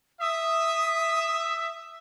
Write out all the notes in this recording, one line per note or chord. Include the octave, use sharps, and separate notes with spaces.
E5 D#6